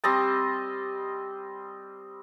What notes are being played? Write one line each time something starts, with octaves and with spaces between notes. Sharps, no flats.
G3 C4 D#5 A5